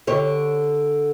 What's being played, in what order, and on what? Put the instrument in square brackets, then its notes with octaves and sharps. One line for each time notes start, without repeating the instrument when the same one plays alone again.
[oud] D3 G4 C#5